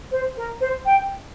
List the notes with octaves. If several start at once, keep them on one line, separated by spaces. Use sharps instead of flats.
C5
A#4
C5
G5